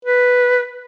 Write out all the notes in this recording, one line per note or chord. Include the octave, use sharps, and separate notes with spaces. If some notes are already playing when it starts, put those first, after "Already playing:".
B4